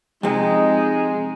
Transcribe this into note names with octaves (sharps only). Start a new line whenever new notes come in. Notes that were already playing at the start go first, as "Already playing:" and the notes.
F2 C3 G#3 D#4